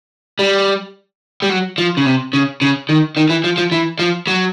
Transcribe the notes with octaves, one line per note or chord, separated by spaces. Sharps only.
G3
G3
F#3
F3
C#3
C3
C#3
C#3
D#3
D#3
E3
F3
F3
E3
F3
F#3